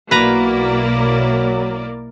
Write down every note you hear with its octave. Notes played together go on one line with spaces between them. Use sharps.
B1 A#3 E4 F#4 A#4 B4 D5 A#5
F#3